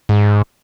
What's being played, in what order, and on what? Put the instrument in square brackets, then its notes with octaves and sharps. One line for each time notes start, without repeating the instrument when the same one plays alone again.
[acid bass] G#2